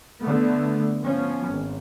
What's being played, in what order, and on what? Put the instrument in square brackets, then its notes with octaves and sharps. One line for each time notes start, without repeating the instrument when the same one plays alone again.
[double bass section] D3 A3 B3
F3 B3 C#4
G#1